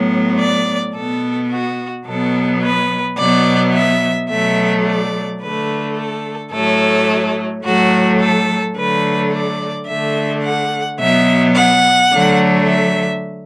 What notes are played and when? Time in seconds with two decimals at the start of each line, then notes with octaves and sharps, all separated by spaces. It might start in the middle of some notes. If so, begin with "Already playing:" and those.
Already playing: A2 F#3 B3
0.38 D5
0.95 B2 B3 A4
1.50 F#4
2.06 B2 F#3 B3 A4
2.62 B4
3.18 B2 F#3 B3 D5
3.74 E5
4.30 B2 F#3 A3 E5
4.85 D5
5.41 D3 A3 B4
5.97 A4
6.53 A2 F#3 A3 A4
7.65 A2 F#3 A3 F#4
8.21 A4
8.77 D3 F#3 A3 B4
9.33 D5
9.88 D3 A3 E5
10.44 F#5
10.99 B2 F#3 B3 E5
11.55 F#5
12.11 D3 F#3 A3
12.67 E5